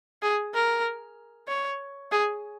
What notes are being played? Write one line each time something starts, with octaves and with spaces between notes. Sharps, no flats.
G#4
A#4
C#5
G#4